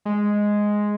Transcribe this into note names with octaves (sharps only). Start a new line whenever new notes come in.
G#3